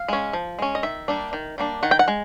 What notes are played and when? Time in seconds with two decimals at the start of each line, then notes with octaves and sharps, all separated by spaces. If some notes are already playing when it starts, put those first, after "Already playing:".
Already playing: F5
0.08 G#3 C#4
0.33 F3
0.59 G#3 C#4
0.75 D#5
0.83 D#3 E5
1.08 G3 A#3 D4
1.33 D#3
1.58 G3 A#3 D4
1.83 D#3 F#5
1.91 G5
1.99 F#5
2.08 G#3